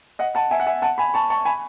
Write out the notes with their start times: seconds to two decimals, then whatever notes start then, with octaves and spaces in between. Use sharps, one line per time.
0.19 D#5 F#5
0.35 F#5 A5
0.51 E5 G#5
0.60 F#5
0.66 E5 G#5
0.82 F#5 A5
0.98 G#5 B5
1.14 A5 C#6
1.30 A5 C#6
1.45 G#5 B5